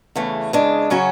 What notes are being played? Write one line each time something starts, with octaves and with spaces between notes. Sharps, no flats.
E2 C#3 E3 A3
C#3 G#3 D4
C#3 F#3 C#4 F#4 C#5